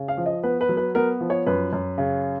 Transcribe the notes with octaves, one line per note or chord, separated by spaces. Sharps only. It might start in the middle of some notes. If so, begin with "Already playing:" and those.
Already playing: C#3
F5
F3
D#5
B3 B4
B4
F#3
B4
B3 A#4
F3
C#5
F#2 B4
F#2
C#3